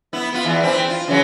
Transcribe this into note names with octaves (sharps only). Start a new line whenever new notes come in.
B3 E4
B3 F4
E2 E3
E3 C4
F4
C#3 E3 F#3